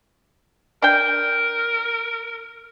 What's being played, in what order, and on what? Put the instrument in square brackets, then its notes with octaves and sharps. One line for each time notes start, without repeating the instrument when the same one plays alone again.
[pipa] D4 G5 [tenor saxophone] A#4